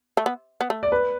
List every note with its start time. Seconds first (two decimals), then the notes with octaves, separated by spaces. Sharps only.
0.17 A3
0.26 B3
0.61 B3
0.70 A3
0.83 D5
0.92 B4